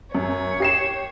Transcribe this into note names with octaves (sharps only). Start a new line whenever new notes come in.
F#2 C#5
G4 C7 E7